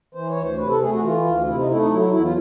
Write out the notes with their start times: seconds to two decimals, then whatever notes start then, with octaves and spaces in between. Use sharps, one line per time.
0.15 E3 C5
0.29 C#5
0.36 D2
0.44 C5
0.58 C3 B4
0.70 A4
0.80 A3 G#4
0.92 F#4
1.02 E3 F4
1.25 D2
1.46 C3 E4
1.58 D#4
1.68 A3 E4
1.79 D#4
1.90 F#3 E4
2.01 E4
2.12 E2 E4
2.23 F4